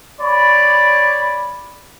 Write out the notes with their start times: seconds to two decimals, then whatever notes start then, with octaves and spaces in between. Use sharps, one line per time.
0.20 C#5 D5 B5